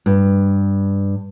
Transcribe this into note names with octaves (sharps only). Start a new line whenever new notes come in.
G2